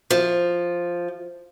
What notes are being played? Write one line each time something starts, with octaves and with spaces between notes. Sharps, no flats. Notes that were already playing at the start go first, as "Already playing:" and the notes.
F3